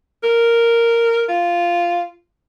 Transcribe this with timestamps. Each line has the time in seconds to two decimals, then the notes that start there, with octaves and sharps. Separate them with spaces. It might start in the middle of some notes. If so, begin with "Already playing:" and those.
0.23 A#4
1.29 F4